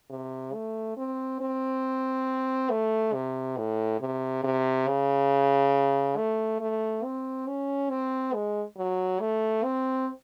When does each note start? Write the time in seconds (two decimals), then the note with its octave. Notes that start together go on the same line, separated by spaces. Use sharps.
0.10 C3
0.54 A3
0.97 C4
1.41 C4
2.70 A3
3.13 C3
3.57 A2
4.00 C3
4.44 C3
4.87 C#3
6.17 A3
6.61 A3
7.04 C4
7.47 C#4
7.90 C4
8.34 G#3
8.77 F#3
9.20 A3
9.64 C4